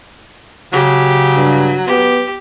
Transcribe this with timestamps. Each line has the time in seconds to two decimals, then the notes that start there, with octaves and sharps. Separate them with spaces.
0.73 C#3 F#3 G4
1.36 G2
1.87 B3 G4